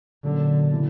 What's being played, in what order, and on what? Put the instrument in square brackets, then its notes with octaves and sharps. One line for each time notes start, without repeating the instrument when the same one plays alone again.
[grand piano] A#2 F#3 C#4 [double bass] D3
[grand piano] C#3 E3